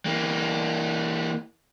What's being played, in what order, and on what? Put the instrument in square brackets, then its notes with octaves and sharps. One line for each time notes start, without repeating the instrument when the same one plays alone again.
[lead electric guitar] E3 A#3